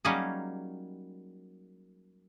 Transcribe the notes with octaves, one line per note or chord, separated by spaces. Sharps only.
F#3 G3 A#3 C#4 D#4 G#4